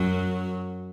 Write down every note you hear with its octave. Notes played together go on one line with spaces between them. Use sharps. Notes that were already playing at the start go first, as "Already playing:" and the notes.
Already playing: F#2 F#3